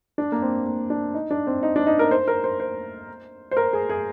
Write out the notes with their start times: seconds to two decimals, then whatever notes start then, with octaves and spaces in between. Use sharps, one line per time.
0.18 D4
0.32 A#3
0.42 C4
0.66 A#3
0.90 D4
1.14 D#4
1.31 D4
1.47 C4
1.63 D#4
1.76 D4
1.87 D#4
1.99 A#4
2.11 C5
2.28 A#4
2.44 C5
2.60 C5
3.51 C5
3.57 A#4
3.73 G#4
3.89 G#4